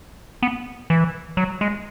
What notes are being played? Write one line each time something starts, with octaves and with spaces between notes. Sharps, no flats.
B3
E3
F#3
G#3